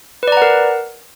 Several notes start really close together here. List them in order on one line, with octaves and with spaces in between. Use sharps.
B4 D5 A#5 F#5 A#4